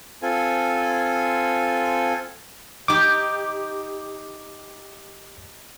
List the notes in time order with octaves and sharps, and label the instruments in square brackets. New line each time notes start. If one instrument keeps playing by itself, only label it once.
[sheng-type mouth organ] C4 F4 A4 G#5
[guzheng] D#4 G4 [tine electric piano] D6